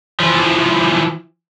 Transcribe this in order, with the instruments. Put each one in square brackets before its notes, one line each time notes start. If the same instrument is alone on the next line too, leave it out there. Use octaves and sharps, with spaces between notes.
[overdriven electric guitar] E3 F3